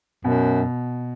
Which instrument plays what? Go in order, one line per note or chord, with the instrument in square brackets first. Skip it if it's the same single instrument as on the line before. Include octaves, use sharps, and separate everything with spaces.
[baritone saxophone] F#2 [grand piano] B2